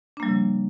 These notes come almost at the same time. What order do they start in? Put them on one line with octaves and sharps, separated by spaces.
D4 A#3 G3 F3 C#3